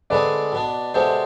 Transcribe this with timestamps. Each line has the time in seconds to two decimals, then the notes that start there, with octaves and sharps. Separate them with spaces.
0.10 D3 G#3 C4 G#4 B4 D5
0.52 B2 B3 D4
0.94 C3 G#3 B3 D4 A4 C5